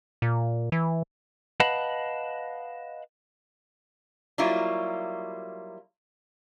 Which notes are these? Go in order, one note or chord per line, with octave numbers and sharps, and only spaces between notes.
A#2
E3
B4 D#5 F5 F#5 A5 B5
F#3 G3 A#3 E4 F4